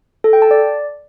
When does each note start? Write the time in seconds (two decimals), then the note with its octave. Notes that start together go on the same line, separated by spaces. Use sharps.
0.24 A4
0.33 G5
0.42 A5
0.51 D5